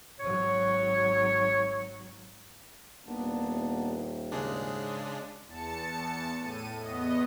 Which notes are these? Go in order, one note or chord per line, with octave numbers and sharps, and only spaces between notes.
G#1 F#3 C#5
D#1 A#3 B3 D4
G#2 C#3 G#3 D4 G#4
E2 A5 C#7
A2 D#7
E2 B3 D#5